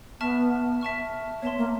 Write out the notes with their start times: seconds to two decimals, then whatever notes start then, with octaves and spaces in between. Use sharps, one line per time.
0.21 B3 E5 A5 C#6 F6
0.81 E5 A5 C#6 F6
1.42 B3 C#5 E5 A5 C6
1.58 A#3